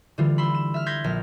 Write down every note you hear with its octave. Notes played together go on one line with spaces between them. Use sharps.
D3 E3 G3 F4
B5 C6 E6
E7
E5 F6
C6 G6 G#6 A#6 B6
A#1 F6